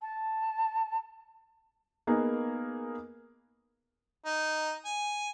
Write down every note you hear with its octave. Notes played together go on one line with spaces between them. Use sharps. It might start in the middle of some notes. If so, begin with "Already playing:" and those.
A5
A#3 B3 D#4 G#4
D#4
G#5